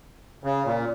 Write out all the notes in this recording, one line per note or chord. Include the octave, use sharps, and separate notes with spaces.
C#3
A#2